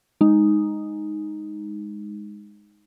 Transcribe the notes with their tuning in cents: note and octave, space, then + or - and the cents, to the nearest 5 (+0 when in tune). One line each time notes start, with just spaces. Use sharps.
G#3 -5 D#4 +0